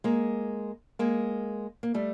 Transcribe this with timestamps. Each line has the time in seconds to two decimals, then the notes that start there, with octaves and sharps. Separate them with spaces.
0.04 G#3 A#3
0.99 G#3 A#3
1.83 A#3
1.94 G3 A3